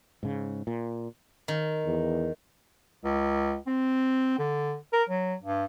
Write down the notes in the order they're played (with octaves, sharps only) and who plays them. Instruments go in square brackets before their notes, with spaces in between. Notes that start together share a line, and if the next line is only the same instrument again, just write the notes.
[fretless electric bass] G#2 C#3
A#2
[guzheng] D#3
[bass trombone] E2
[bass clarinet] C#2
C4
D3
A#4
F#3
G2